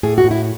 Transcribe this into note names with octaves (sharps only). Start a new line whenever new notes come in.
A2 G#4
F#4
A2
E4